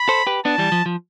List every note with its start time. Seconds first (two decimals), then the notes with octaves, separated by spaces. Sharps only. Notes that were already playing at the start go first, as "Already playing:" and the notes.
Already playing: B5
0.09 A4 C5
0.27 G4 B4
0.45 B3 D4 A5
0.58 E3 G3
0.72 F3
0.86 F3